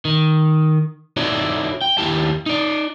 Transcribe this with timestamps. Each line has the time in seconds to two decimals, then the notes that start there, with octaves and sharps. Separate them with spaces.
0.05 D#3
1.17 D#4 E4 F#4 A4 C#5 D5
1.82 G5
1.98 D#2 E4 G4 A5
2.46 D#4 D5